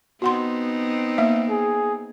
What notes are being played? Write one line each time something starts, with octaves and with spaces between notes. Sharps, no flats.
B3 C4 D#4 F#4 F#5 C6
A#3 E5
G#4